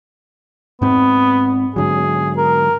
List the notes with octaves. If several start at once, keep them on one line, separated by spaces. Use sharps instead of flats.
G#2 B3 C4
G#2 D3 F#3 G#4
A#4